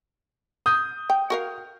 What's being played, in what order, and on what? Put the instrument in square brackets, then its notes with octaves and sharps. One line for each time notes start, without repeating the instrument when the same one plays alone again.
[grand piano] D#6 G6
[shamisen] G5
F#4 A#4 F5